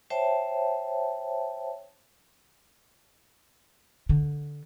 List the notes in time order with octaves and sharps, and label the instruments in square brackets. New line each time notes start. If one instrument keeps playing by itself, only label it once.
[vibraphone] C5 C#5 E5 G5 A5
[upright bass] D3